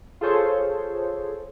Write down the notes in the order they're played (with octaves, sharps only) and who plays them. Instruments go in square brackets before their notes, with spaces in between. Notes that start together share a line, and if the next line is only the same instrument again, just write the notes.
[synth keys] F4 G#4 A4 C5 C#5